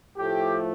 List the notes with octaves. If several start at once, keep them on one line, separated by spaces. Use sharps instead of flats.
A2 F3 A3 G4